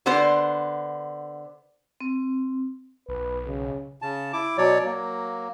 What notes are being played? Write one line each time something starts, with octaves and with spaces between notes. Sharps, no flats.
D3 B3 C5
C4
B1 B4
C#3
C#3 A5
E4 D6
B2 F#3 C#5 D5
F#3 A#3